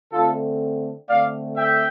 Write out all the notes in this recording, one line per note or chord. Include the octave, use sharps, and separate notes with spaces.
D3 A3 C4 F4 A4
D3 A3 C4 D5 F5
E5 G5